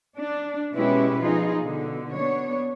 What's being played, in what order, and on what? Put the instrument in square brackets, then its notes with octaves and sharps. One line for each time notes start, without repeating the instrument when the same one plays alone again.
[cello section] D4
B2 G#3 C#4 E4 G4 B4
F3 D#4 F4 G#4
B2 D3
B3 D4 C#5